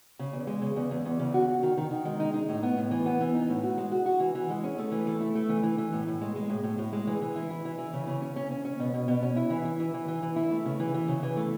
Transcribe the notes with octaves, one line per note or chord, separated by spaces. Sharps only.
C#3
E2
G#3
C#3
E2
E2
E2
C#3
F#4
F#4
D#3
D#3
D#3
G#3
D#4
D#4
A2
B3
A2
E3
B3
E3
D#4
A2
F#4
G#3
F#4
F#4
E3
E3
G#3
C#4
A3
E3
A3
E4
A3
E3
E3
E3
A2
A2
G#3
G#3
A2
A2
A2
G#3
E3
E3
E4
E3
E3
E3
C#3
C#3
C#4
C#4
C#4
C#4
B2
B2
B2
C#4
E4
E3
E4
E3
E3
E3
E3
E4
A3
C#3
E3
E3
C#3
E3
A3